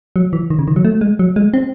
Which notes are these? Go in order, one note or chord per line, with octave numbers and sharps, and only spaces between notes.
F#3
E3
D#3
C#3
D#3
F#3
A3
G#3
F#3
G#3
C4